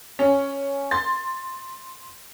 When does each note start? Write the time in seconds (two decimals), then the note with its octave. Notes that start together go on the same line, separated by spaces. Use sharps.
0.19 C#4
0.91 C6 A6